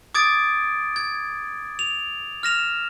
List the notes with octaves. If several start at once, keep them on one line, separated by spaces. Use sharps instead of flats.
D6 D#6 G#6 A6 D7
G#6
F7
F6 A#6 E7 F7